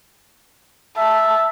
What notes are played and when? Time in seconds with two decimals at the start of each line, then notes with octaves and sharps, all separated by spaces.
0.97 E5 A5